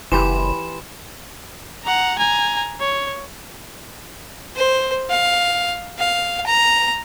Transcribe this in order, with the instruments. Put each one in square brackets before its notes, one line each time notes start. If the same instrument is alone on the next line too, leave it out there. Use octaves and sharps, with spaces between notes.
[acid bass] F#1 [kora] E3 G4 [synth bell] B5 C6 E7
[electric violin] F#5 A#5
G#5 A#5
C#5
[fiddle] C5
F5
F5
A#5